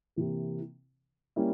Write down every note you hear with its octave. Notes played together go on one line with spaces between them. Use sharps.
C3 E3 A#3
G3 A#3 C#4 E4